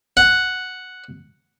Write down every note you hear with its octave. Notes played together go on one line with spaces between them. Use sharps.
F#5